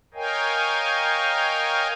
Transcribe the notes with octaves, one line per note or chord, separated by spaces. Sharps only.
A#4 C#5 D#5 F5 G5 G#5